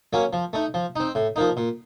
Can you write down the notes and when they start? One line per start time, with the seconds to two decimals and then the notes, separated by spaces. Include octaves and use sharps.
0.13 F#3 A#3 C#4
0.33 F3
0.53 A3 D#4
0.74 F3
0.96 C4 D#4
1.15 A2
1.36 F3 A#3 D#4
1.57 A#2